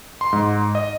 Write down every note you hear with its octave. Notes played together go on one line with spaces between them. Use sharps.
C6
G#2
D#5